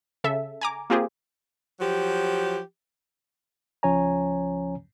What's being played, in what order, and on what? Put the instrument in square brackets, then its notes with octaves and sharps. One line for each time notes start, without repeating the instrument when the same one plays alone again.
[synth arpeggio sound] C#3 A4 E5
G#5 A#5 D6
A#3 C4 F4 G4 G#4 C5
[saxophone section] F3 F#3 G4
[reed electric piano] C#2 F3 C#4 C#5 G#5 A#5